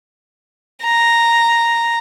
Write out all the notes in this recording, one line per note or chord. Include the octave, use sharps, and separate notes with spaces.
A#5